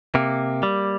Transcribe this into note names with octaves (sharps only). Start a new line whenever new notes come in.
C3 A#3
G3